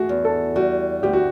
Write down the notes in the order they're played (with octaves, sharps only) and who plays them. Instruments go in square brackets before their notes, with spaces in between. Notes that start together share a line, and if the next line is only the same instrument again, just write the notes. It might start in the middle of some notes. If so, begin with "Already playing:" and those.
Already playing: [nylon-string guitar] A3 [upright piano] F#4 G#4
[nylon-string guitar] E2
[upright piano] A4
[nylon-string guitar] G3 [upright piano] F#4
[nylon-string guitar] D2 [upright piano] G4
[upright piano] F#4